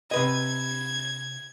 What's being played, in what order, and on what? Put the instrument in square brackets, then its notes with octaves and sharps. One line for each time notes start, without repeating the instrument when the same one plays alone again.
[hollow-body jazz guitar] C3 B4 D#5 [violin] G#6